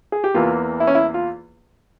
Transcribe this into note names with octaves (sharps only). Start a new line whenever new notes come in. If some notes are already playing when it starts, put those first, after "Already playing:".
G#4
G4
E2 E3 A#3 F4
E4
C#4
E4
F4